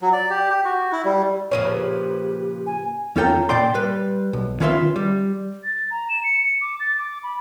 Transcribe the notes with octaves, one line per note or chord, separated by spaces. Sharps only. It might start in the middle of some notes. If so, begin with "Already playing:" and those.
F#3
D5
G4
G4
F#4
E4
G3
A#2 C#3 F3 C#5 D#7
G4 B4
G#5
E2 C#4 F4 A4 G5 A#5
A#2 D5 G5 C6
G3 B4
B1
D#3 C#4 F4 B4 E5 C6
G3
A6
A#5
E7
C#7
C#7
D6
A6
D6
B5